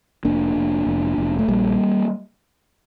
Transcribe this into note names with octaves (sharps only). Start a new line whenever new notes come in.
F1 A#3 D4
F1
F1
F1
A3
A#1 G3 A#3